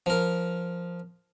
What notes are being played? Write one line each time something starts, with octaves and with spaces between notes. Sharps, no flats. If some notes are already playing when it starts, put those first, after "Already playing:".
F3 A#4